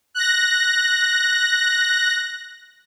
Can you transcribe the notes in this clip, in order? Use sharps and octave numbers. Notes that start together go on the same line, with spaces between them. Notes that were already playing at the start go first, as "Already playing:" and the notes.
F#6 A#6